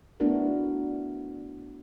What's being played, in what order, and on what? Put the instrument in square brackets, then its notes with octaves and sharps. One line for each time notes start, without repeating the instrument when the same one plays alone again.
[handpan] A3 B3 D4 E4 F#4 A#4